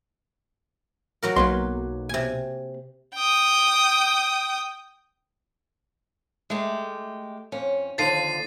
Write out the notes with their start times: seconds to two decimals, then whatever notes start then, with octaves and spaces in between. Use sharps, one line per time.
1.22 F#3 F#4 A#4
1.36 B1 A#3 B4 C6
2.09 C3 G#5
3.15 G5 D#6
6.50 G#3 A3 G4
7.52 F2 C#4
7.98 D#2 D3 F3 A6 C7 D#7